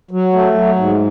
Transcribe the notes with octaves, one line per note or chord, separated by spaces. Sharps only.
F#3
A3
F#3
G#2